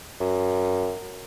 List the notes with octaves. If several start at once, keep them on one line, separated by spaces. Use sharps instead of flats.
F#2